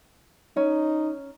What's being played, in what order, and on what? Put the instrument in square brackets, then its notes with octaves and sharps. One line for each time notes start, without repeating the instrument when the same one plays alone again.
[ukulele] C#4 [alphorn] D#4